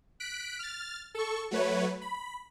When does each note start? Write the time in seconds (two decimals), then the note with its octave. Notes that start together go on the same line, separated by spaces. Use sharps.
0.20 F#6 B6 D7
0.59 F6 A6
1.15 A4 C#6
1.51 F#3 A3 B4 C#5
2.01 B5